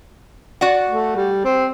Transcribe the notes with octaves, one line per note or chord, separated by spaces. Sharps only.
F#4 D5 F#5
A3
G3
C4